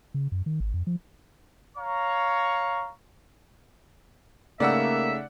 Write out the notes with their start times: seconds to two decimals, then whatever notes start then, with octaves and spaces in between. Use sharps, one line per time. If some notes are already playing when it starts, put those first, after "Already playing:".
0.14 C#3
0.32 F#2
0.46 D#3
0.60 G#1
0.74 F2
0.87 F3
1.77 C#5 F5 A#5 C#6
4.60 C#3 A3 A#3 D#4 D5 E5 F#5 E6